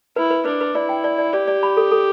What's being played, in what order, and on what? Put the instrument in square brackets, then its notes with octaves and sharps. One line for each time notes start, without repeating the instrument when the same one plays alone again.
[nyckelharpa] E4 [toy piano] B4
[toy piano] B4
[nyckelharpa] D4 [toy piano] B4
[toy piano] B4
[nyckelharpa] E4 [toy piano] D5
[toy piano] G5
D5
D5
[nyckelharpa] G4 [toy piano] D5
[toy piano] D5
B5
A4
A4